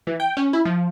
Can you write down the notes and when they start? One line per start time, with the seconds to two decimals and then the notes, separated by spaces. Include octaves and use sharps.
0.07 E3
0.20 G5
0.37 C#4
0.53 E4
0.65 F3